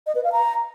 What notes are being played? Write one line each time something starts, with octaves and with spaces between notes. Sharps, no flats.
D#5
B4
F5
A#5